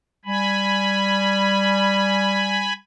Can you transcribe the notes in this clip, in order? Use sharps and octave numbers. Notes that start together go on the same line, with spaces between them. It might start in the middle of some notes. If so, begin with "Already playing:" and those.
G3 G#5 B5